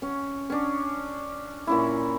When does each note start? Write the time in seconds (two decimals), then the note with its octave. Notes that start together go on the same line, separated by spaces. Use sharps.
0.02 C#4
0.50 C#4 D4
1.67 A#2 C#4 E4